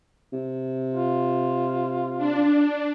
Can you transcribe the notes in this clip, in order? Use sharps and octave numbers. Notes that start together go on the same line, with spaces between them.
C3
F4
D4